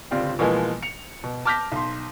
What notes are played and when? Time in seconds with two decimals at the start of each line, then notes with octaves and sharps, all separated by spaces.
0.11 G1 C#2 C4 F4 G4 D5
0.39 B2 E3 F3 G#3 A#3 B3
0.82 C#7 F7
1.24 B2
1.45 A5 D6 F6 G6 A#6 B6
1.72 B1 C6